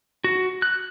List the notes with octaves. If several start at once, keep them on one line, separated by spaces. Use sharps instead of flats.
F#4
F#6